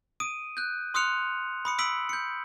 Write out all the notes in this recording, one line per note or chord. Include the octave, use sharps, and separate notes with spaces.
D#6 D7 D#7
F#6 G6
C6 D#6 F6 F#6 C#7 F7
B5 D#6 C#7
D#6 E6 B6 D7 F#7
G6 C#7